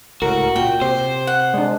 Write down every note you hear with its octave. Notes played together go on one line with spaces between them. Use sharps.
C#2 A2 F#4 A#4
A#2 G5
C3 C5
F#5
G#3 D4